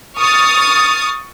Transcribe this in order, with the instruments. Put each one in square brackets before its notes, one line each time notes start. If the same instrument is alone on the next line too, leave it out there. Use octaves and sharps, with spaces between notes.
[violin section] C#6 D#6 F6 A6